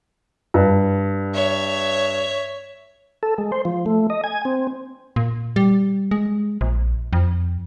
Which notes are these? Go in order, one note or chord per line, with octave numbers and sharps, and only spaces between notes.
G2
C#5 E5
A4
G#3
C5
F3
A3
D#5
G#5
C4
A#2
G3
G#3
A#1
F2